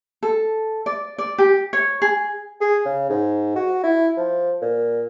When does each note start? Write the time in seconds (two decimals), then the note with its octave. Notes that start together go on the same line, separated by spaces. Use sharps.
0.23 A4
0.86 D5
1.18 D5
1.38 G4
1.73 C#5
2.02 G#4
2.61 G#4
2.85 C#3
3.09 G#2
3.56 F#4
3.83 E4
4.17 F3
4.61 A#2